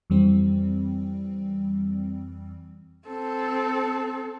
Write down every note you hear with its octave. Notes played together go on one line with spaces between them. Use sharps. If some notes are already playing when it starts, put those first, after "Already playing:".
F2 E3 G3 C4
C4 A4